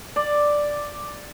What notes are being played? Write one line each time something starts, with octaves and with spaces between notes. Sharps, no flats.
D5